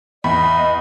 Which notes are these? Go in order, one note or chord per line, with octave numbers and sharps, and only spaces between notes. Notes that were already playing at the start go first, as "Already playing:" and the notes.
E2 D#5 B5